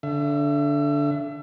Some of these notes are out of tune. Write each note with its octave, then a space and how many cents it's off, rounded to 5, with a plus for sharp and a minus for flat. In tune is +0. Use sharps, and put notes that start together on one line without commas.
D3 -15 E5 +35